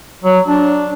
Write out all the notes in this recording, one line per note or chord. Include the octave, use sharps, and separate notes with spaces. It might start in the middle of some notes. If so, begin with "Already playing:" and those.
F#3
D4